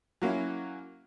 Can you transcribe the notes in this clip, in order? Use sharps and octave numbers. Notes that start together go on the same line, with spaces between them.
F#3 A#3 C#4 E4